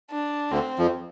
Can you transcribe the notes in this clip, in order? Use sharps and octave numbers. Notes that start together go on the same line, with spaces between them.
D4
D2 D3 C4
F2 F3